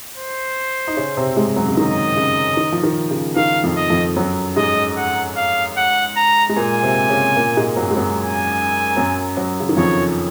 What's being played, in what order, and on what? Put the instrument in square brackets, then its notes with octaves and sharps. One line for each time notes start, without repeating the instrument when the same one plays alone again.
[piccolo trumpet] C5
[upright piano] D#4
C#3 C#4
C3 C4
G#2 G#3
F#2 F#3
C#3
[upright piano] D#3 [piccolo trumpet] D#5
[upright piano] C#3
D#3
F3
D#3
C#3
[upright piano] D#3 [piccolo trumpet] F5
[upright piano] F2 F3
[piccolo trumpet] D#5
[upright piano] F2 F3
F#2 F#3
[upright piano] G#2 G#3 [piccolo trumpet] D#5
[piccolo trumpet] F#5
F5
F#5
A#5
[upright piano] G#3
[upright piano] A#2 A#3 [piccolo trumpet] G#5
[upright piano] C3 C4
C#3 C#4
A#2 A#3
G#2 G#3
F#2 F#3
G#3
F#2 F#3
[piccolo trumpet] G#5
[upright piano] F#2 F#3
F#2 F#3
C#3
D#3
[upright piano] F2 F3 [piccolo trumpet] C#5